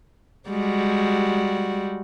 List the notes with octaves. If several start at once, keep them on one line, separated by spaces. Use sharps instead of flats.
G3 G#3 F#4